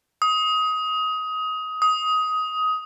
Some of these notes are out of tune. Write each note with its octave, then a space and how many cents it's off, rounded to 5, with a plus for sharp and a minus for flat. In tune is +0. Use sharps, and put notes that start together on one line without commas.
D#6 +20
D#6 +15